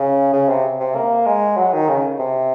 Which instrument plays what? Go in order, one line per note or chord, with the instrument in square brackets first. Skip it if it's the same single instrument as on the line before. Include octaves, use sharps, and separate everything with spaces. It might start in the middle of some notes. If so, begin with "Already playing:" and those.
Already playing: [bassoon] C#3
C#3
C3
C3
A#3
G#3
F#3
D#3
C#3
C3